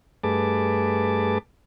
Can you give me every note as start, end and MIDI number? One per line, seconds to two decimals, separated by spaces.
0.24 1.38 43
0.24 1.38 57
0.24 1.38 68
0.24 1.38 71
0.24 1.38 81
0.24 1.38 86